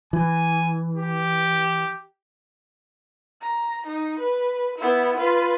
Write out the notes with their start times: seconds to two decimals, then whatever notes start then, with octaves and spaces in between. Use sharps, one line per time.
0.13 E3 G#5
0.94 G4
3.42 A#5
3.86 D#4
4.19 B4
4.78 B3 E4
5.17 F4 B4